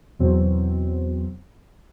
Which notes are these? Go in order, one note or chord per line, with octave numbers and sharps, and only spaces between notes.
E2 B2 F#3 C4